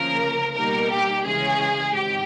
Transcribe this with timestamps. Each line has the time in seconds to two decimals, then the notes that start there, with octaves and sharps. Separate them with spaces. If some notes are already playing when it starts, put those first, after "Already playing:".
Already playing: D2 C#3 F3 A#3 A#4
0.55 B2 G3 A#3 D#4 A#4
0.90 G4
1.25 D2 C#3 E3 G#3 C#4 G#4
1.95 G#1 G#2 G4